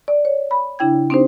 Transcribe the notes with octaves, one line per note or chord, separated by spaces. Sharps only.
D5
C#5
B5
C#3 D4 E4 G5 G#6
C4 D4 D#4 G4 C5